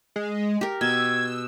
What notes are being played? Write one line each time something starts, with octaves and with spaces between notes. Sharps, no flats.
G#3
G4 A#4
B2 E6 G#6